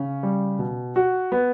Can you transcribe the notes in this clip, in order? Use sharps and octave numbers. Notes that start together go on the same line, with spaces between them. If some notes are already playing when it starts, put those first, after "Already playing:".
Already playing: C#3 C#4
G3
B2
F#4
B3